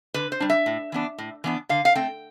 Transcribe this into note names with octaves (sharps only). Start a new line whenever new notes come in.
D3 B4
C5
G3 D4
E5
A2
E3 B3 D4
A2
E3 B3 D4
D3 F5
F5
A3 C4 G5